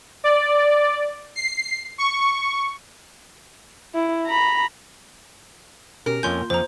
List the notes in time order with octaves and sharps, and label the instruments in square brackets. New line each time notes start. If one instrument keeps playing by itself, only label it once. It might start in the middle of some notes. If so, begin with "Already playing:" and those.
[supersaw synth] D5
C7
C#6
[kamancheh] E4
A#5 B5
[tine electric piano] B2 C#4 G4 [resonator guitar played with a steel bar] A#4
[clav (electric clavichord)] F2 C#4 G#5 [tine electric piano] A#3 F4 [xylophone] C6 G6
[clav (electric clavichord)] F2 F3 [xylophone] C5 A#5